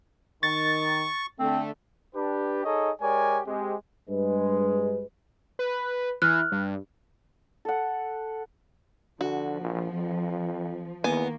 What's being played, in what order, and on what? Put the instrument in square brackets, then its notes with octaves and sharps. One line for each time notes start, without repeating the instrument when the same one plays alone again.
[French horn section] D#3 [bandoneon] C#6 [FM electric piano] A6
[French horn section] D3 A3 [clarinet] C4
[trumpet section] D4 G4 B4
D#4 G#4 A4 C#5 D#5
G#3 G4 A#4 C#5 D5 G#5
G#3 C4 G4
[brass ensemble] G2 G#3 B4
[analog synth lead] B4
[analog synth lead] E3 [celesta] F6 F#6
[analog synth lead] G2
[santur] A4 F#5
[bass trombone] D3 [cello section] F3 [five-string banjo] F#4
[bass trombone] A#1
F2
[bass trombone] E2 [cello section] D#3 A#3 [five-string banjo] B3 G#5